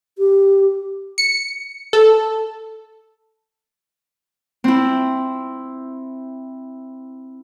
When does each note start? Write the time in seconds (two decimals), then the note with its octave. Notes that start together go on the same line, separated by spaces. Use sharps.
0.18 G4
1.18 C#7
1.93 A4
4.64 C4 E4